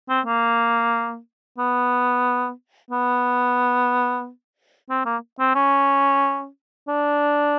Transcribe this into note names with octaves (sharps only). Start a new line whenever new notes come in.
C4
A#3
B3
B3
C4
A#3
C4
C#4
D4